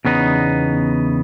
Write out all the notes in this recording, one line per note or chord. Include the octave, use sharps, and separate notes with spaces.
E2 C#3 B3 D#4